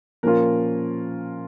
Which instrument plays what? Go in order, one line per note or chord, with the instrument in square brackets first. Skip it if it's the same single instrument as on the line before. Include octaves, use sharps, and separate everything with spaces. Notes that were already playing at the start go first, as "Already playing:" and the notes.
[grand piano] A#2 F3 A#3 C#4 F4 A#4